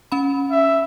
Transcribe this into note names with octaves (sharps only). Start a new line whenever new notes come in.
C#4 B5
E5